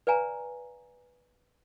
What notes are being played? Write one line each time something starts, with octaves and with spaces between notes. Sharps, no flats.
B4 D5 F5 G#5 A#5